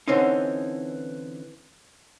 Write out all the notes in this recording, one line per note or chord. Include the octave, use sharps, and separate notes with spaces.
D3 E3 C4 C#4 D#4